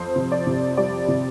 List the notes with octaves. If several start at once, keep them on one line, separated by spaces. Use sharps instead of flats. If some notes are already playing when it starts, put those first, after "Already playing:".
Already playing: F2 C5
C3
D5
C3
G3 D5
C3